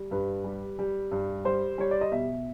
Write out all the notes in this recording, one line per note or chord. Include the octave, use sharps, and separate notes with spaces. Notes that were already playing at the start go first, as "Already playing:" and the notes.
Already playing: G3
G2 B4
G3
G3
G2
G3 C5
G3 C#5
D5
D#5
B2 E5